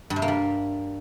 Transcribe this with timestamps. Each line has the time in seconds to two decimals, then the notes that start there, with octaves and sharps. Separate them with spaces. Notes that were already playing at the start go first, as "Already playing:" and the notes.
0.10 G2
0.16 C3
0.22 A#3
0.28 G3